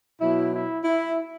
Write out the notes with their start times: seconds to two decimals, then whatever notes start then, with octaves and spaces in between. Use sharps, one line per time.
0.21 B2 F#3 E4
0.53 E4
0.84 E4